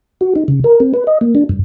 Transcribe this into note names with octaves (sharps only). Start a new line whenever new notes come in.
F#4
D#4
C#3
A#4
C4
B4
D#5
A#3
D4
G2